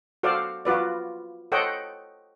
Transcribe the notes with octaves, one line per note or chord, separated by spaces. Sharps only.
F#4 A4 C5 D5 F5
F4 F#4 B4 D5
A4 C5 C#5 D#5 F#5 G5